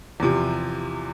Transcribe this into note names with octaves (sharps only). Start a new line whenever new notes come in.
E2 C3 F3